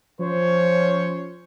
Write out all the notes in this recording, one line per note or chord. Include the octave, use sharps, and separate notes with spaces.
F3 C#4 C5 C#5